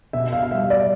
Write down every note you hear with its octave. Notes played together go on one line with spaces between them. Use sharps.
B2 E5
F5
G3 E5
D5